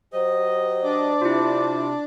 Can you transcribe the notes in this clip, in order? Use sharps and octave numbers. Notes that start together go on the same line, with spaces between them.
F#3 G4 C5 D#5
D4 D5
C3 E4 F4